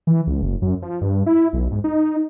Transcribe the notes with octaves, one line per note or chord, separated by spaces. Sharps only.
E3
C#2
F#1
F#2
F3
G2
E4
B1
G#2
D#4